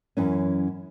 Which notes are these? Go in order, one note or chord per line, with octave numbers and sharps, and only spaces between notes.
F#2 E3 B3 C#4